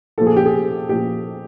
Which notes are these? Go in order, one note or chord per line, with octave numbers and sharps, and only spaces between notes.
A#2 F3 A4
G#4
G4
G#4
A#2 F3 G4